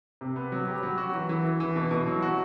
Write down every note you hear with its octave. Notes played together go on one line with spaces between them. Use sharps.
C3
B3
F#3
G4
F#3
F#4
E3
E3
E3
E3
B2
B2
F#3
F#4